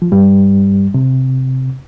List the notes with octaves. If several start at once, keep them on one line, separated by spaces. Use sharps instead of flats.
F3
G2 G3
C3